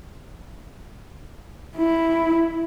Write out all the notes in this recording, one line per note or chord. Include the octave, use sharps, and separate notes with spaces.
E4